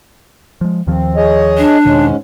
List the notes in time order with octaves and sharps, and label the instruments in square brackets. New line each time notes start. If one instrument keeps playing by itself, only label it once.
[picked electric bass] F3 G#3
[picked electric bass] D#2 D#3 F3 [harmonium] C4
[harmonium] G#4 C#5 D#5
[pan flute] D4
[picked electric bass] E2 B2 D#3 [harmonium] G#2 G#3 C#4